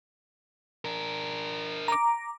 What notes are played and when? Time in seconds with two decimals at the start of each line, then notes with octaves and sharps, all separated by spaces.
0.85 D4 A#4
1.88 A#5 D6